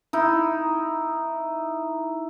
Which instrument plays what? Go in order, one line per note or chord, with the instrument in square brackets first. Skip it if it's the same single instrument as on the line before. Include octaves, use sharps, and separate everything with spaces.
[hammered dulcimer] D#4 E4